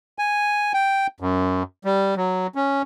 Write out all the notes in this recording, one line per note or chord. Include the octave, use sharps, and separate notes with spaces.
G#5
G5
F#2
G3
F#3
C#4